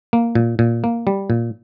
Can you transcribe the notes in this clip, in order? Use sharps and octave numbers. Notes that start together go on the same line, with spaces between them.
A#3
A#2
A#2
A#3
G3
A#2